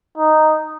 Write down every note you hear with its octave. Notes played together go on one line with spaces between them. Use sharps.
D#4